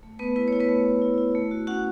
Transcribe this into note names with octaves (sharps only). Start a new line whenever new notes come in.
A3
A3 B3 B4
E4 B4
E4 C#5
B3 B4
A3
A3
E4
E4
A3
F#4
C#4 F#4 F#5